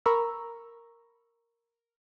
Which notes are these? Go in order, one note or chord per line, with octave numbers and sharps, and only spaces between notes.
A#4 A#5 B5 C#6 E6